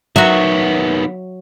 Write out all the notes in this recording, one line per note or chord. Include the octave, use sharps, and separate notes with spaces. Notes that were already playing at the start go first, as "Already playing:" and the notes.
D#3 F#3 B3 F#4 E5